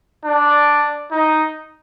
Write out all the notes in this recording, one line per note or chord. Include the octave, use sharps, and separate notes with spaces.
D4
D#4